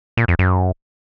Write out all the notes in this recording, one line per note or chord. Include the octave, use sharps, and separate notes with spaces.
A#2
F2
F#2